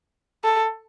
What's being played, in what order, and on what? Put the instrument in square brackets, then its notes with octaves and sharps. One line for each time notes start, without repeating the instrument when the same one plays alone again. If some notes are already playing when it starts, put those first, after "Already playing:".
[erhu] A4